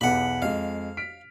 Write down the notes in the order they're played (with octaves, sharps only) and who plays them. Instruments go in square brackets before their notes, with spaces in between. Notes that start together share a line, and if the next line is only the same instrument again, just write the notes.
[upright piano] B1 E2 B3 [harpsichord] F#5 B5
[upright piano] F2 G#3 [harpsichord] F5
[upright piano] F6 B6 D7